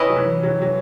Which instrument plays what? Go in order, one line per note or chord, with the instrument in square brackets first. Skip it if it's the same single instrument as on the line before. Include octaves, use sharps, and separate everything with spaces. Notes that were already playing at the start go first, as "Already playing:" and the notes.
Already playing: [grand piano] D#3 [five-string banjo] C#4 E4 B4 D#5
[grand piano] F#3
E3
F#3
F#3